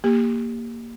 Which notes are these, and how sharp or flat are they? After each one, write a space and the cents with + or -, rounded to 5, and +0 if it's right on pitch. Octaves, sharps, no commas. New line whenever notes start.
A#3 +0 G4 +15